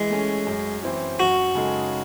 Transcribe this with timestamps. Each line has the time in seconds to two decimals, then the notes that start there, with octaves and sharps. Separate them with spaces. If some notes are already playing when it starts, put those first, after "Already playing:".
Already playing: E3 G#3
0.10 A3 C#4
0.47 F#2
0.83 E3 C4 E4
1.19 F#2 F#4
1.55 C#3 G#3 D#4 A4